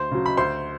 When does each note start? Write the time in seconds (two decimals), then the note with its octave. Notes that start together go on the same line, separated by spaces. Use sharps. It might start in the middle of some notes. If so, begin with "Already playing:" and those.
Already playing: D2 C5 C6
0.11 C#3 F#3
0.26 B5
0.37 D2 C5 C6